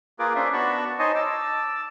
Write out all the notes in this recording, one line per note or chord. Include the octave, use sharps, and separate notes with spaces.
A#3 F4 G#4 A#4 B4 D6
C#4 D4 C5 E5
B3 D4 F#4 A5 B5 C#6
D#4 C5 C#5 D#5 G#5 A5
A5 D6 E6